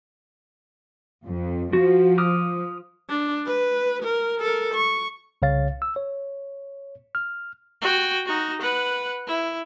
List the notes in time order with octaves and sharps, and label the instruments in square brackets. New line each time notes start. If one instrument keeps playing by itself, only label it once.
[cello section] F2
[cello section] F3 [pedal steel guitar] F#4
[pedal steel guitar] D6 D#6 F6
[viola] D4
B4
A#4
A4 A#4
C#6
[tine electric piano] C2 C#3 C#5 F5 A6
E6
C#5
F6
[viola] F#4 G5
D#4 F#4
B4 F#5
E4